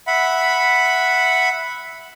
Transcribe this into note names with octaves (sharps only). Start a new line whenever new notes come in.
E5 F#5 B5